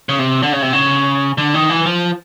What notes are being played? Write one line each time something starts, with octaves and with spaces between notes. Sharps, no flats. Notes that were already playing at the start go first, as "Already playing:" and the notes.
C#3
C3
D3
C#3
C3
C#3
D3
D#3
E3
F3